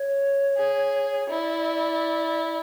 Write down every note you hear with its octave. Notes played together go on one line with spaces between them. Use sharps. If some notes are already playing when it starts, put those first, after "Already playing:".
Already playing: C#5
G#4
E4 D5